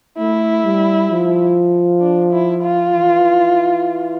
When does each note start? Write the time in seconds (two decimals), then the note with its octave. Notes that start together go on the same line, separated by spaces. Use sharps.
0.18 A3 E4
0.63 G3
1.10 F3
2.01 D4
2.32 E4
2.62 F4
2.93 E3